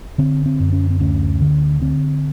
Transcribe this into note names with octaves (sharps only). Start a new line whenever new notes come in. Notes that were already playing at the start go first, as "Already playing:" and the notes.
D3 C4
C4
F#2
C#4
C4
D2 C#4
D3
D3 C4